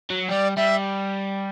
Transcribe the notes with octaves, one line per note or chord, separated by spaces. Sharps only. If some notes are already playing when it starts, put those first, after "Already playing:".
F#3
G3 D5
G3 E5